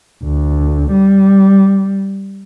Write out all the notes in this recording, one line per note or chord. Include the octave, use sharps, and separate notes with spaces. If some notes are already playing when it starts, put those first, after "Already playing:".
D2
G3